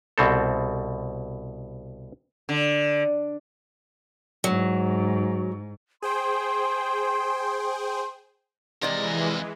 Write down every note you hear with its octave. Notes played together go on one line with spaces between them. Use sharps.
C2 B2 C4 A4
D3
G#2 F#3
G#4 C5 G5 C6
F2 C3 E3 G#3 A#4 D5 D#5